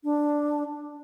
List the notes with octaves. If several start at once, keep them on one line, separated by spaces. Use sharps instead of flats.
D4